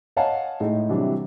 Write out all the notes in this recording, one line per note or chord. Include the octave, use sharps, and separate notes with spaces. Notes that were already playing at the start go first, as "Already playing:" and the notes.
C#5 D#5 F5 F#5 G#5 A5
A2 G#3 D#4
C3 E3 F#3 G3 D4